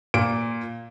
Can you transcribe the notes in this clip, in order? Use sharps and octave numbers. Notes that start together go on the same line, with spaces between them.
A#2 D7